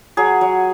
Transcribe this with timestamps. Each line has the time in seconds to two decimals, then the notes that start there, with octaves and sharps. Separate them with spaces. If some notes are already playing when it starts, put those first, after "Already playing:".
0.17 F#3 G#4
0.41 F#3